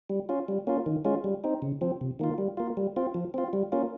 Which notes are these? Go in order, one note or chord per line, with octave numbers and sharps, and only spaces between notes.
G3
C#4 F4
G3
A#3 C#4 F4
D#3
G#3 C#4 F4
G3
C4 D#4
C#3
F3 C4
C3
D#3 A#3 F4
G3
A#3 F4
G3
C4 F4
F3
C4 F4
G3
A#3 C#4 F4